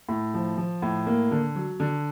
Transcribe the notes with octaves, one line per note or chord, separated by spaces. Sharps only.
A2
F3
F3
A2
A#3
D3
F#3
D3